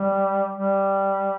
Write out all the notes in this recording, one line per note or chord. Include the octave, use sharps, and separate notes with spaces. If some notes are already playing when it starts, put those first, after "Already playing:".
Already playing: G3
G3